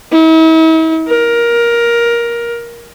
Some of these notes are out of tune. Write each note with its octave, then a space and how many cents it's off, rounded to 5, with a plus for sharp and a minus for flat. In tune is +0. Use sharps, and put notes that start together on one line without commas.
E4 -45
A#4 +15